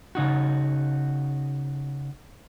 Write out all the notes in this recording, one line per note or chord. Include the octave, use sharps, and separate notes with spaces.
C#3 D#4 F#4